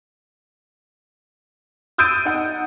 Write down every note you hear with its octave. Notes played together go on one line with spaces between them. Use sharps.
D#6 E6 G6 A6 D7 D#7
D#4 F#5